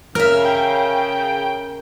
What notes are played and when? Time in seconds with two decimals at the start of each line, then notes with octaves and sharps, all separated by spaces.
0.15 C#3 A#4 E5 F6
0.45 G5